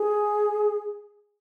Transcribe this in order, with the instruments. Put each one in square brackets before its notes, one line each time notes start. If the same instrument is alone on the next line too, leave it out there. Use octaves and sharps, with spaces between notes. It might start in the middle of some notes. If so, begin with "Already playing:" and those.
Already playing: [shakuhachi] G#4